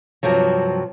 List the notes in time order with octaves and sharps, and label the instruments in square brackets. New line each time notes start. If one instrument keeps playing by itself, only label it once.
[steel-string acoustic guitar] G2 C3 F3 F#3